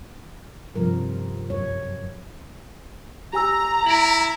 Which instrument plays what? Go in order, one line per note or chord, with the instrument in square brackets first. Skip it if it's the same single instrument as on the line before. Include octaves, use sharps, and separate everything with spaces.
[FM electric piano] G2 [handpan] C3 F3 A#4
[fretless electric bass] F#2 [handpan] C#5
[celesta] G4 G#5 E6 [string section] A#5
[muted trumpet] E4 [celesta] D7 F#7